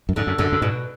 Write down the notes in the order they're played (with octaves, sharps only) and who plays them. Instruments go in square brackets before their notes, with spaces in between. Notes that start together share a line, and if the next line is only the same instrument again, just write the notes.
[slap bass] F#2
[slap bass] G#2 [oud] D3
[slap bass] F#2
[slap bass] F#2 [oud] D3
[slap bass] F#2
[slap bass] G#2 [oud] B2